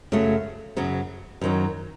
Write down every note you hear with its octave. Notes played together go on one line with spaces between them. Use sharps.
F#2 C#3 F#3 A3
F#2 C#3 F#3
F#2 D#3 F#3